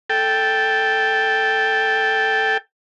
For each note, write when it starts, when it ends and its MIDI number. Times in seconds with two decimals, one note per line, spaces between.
0.10 2.57 69
0.10 2.57 79